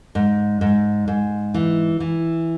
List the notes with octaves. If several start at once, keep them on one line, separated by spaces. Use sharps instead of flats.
G#2
G#2
G#2
E3
E3